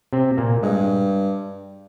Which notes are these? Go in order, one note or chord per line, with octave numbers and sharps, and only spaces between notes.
C3 C4
A#2 A#3
G2 G#3